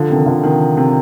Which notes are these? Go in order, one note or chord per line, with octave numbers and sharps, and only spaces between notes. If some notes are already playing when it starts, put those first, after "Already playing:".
Already playing: D3 F3
C3 D#3
D3 F3
C3 D#3
C3